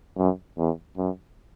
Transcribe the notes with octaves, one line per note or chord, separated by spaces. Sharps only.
F#2
E2
F#2